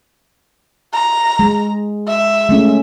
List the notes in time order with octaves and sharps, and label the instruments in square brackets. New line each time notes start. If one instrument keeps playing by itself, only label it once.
[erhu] A#5
[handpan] G#3
[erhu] E5
[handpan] G#3 A3 C#4